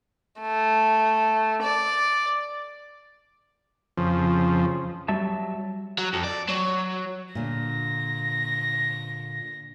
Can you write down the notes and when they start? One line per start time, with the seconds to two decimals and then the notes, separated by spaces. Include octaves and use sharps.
0.40 A3
1.63 D5
3.97 F2 C#3 F3
5.08 F#3 G3 E5 A5
5.98 F#3
6.13 F2
6.24 D5
6.49 F#3
7.35 A#2 D3 A#6